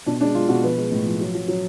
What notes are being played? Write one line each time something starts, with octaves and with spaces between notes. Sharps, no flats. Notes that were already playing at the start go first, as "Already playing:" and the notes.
B2 D4
G#3 D4
G#3 F4
B2 F#4
F3 B4
G#3
A2
F3
F#3
F#3
F#3